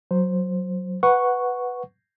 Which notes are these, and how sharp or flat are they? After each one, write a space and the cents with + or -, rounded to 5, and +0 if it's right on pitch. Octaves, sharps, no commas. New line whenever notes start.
F#3 +0 C5 +0
B4 +0 F#5 -5 C#6 +0